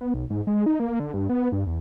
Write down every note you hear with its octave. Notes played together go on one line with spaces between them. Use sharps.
B3
B1
G#2
G#3
D#4
A#3
D3
G2
B3
G2
E2